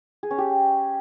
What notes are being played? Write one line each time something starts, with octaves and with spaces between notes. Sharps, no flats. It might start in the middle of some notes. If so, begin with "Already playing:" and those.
G#4
C#4
G4